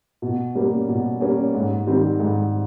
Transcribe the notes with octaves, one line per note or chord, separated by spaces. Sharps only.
B2
G3 A#3 C#4
B2
G3 A#3 C#4
G#2
D#3 G3 C4
G#2